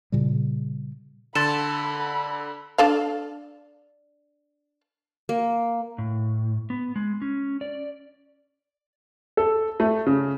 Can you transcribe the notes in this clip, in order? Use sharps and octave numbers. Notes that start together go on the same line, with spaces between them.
A#2 C#3 G3
D3 A4 B5 C6 A6 E7
D4 A4 F5
A#3
A2
B3
G#3
C#4
D5
A4
A3
C#3